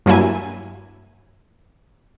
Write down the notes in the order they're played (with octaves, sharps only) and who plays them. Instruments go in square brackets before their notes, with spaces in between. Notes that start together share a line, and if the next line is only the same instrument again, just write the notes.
[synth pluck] G2 F#3 A#3 E4 G#5